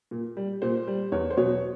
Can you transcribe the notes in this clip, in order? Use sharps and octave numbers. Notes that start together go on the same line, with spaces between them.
A#2
G3
A#2 C5
G3
E2 C#5
C5
B2 F#3 C#5